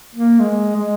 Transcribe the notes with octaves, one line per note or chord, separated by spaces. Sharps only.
A#3
G#3
G#3